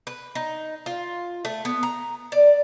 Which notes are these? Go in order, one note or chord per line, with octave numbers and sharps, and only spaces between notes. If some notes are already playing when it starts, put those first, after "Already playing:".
B4
D#4
F4
A3
B3
A#5
D5